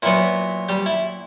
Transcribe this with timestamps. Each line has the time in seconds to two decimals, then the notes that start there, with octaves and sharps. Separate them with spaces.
0.02 A#2 F#3 B3 E4
0.69 G3 G4
0.86 E4